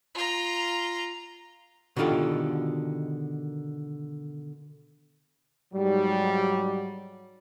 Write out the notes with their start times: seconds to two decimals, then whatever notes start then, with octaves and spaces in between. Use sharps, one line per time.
0.15 F4 A#5
1.96 B2 D3 D#3 F4 G4 A4
5.74 G#2 F#3 G3